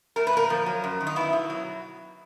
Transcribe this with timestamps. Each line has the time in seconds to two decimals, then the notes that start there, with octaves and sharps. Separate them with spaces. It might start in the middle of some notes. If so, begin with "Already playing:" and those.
0.16 A3 A#4
0.27 B4
0.33 A#2 A#4
0.50 F3
0.66 F#3
0.84 F#2
1.01 D#3
1.07 D#4
1.16 B3 E4
1.33 B2
1.50 F#3